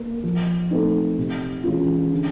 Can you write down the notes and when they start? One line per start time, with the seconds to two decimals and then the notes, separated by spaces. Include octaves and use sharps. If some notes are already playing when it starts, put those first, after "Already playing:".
Already playing: A#3 A#4
0.23 F3
0.71 A3 C4 D#4
1.18 C3
1.64 E3 G#3 C#4 F4
2.11 D3